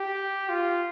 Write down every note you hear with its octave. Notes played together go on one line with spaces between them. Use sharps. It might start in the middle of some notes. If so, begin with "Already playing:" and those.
Already playing: G4
F4